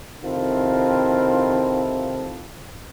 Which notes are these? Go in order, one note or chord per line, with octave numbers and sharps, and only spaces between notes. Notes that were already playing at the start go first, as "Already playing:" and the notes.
C3 D#3 C4 E4 F4 A4